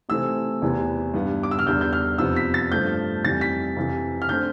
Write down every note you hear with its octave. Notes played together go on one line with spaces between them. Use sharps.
C3 E3 A3 C4 E6
E2 C3 E3 B3
G2 E3 B3
D6
E6
F6
E2 D3 G3 G6
G6
F6
F2 C3 F3 B3 E6
B6
A6
G2 F3 A3 G6
F2 E3 G3 A6
B6
F2 C3 E3
F6
D3 A3 C4 G6